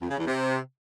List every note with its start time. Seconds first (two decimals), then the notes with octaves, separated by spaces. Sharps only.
0.01 F2
0.10 C#3
0.18 E2
0.27 C3